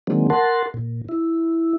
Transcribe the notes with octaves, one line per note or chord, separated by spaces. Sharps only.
D3 D#3 F#3 G#3 A#3 C4
A#4 F#5 A5 C6
A#2
E4